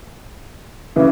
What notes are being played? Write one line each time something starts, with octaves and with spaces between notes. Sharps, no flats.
C#3 E3